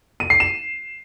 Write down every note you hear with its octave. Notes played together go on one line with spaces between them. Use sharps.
D#7
C7
E7